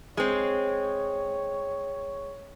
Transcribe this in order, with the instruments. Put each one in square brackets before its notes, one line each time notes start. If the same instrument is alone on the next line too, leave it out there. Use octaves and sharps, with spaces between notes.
[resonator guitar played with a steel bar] G#3 C4 [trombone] C#5